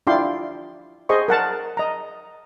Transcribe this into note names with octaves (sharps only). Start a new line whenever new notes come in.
D4 E4 F4 G5 C6 D6
G#4 C5 D#5 C6 C#6
A#4 F#5 A5
D#5 A#5